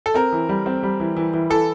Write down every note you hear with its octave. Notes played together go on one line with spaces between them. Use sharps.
A4
C4 A#4
E3
G3
C4
G3
E3
E3
E3
E3 A4